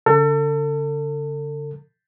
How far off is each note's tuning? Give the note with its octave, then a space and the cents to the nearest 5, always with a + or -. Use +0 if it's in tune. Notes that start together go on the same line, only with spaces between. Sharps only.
D3 -45 A4 +35